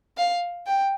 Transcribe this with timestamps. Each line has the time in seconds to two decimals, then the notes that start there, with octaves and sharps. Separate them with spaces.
0.18 F5
0.67 G5